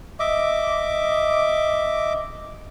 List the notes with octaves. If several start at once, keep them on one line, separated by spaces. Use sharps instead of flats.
D#5 E5 D6